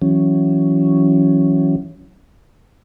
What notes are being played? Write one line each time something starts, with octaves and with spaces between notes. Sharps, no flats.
E3 F#3 C#4